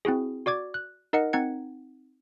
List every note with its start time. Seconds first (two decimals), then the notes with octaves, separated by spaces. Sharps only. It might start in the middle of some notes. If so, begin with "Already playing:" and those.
0.05 C4 E4 F#4 G#4
0.46 F#4 D5 D6 G#6
0.74 F#6
1.13 D#4 A#4 D#5 F#5 C#7
1.33 C4 D#4 F#5 G#6 C#7